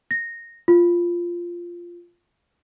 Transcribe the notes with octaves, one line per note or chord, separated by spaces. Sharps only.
A#6
F4